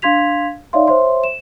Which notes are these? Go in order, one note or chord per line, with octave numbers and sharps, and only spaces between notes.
D4 F5 C6 G#6 B6 F7
D#4 C#5 D5 E5 F5 C6
C5 C#5 E5 C6
E7